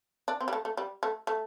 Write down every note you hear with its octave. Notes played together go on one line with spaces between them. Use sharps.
D4
C4
G3
A3
A3
G3
A3
A3